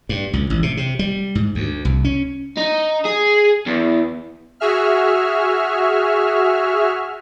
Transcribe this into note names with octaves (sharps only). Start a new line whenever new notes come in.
G2
C#2
A1
C3
C3
G3
G#2
D2
C2
C#4
D#4
G#4
E2
F#4 G#4 E5 F6